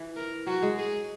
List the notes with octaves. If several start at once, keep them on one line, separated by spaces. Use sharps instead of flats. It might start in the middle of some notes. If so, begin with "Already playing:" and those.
Already playing: E3
A#4
F#3 F#4
G#3
G#4